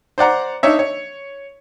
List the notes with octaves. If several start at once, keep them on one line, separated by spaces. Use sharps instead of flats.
C5 D5 F#5 A#5
D4 D#4 C#5 E5
C#5